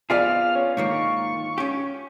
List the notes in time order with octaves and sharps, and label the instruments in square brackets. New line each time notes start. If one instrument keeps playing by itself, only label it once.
[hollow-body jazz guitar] B3 C4 G#4 [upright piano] F4 D5 F5 [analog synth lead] F6
[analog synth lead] C#4
[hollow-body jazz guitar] G#2 D#3 A#3 [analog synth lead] C#6
[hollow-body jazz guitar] C#4 G4